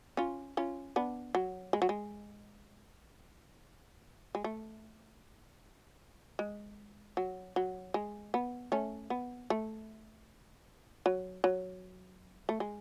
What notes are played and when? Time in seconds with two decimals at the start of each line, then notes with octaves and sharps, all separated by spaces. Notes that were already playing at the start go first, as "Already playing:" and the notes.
0.17 C#4 F4
0.57 C#4 F4
0.96 B3 D4
1.35 F#3
1.73 G#3
1.82 F#3
1.89 G#3
4.35 G#3
4.44 A3
6.39 G#3
7.17 F#3
7.56 F#3
7.94 G#3
8.34 B3
8.72 A3 C#4
9.10 B3
9.50 A3
11.06 F#3
11.44 F#3
12.49 A3
12.60 G#3